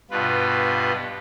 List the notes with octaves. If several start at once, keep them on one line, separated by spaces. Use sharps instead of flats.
G2 B2 F4 B4